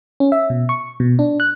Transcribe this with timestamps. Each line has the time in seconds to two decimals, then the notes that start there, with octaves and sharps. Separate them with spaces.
0.20 C#4
0.32 E5
0.50 B2
0.69 C#6
1.00 B2
1.19 D4
1.40 F#6